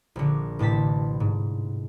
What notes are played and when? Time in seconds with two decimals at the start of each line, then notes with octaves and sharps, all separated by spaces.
0.16 A#1 D3
0.59 A1 A2 C3 A5 B6
1.20 G#2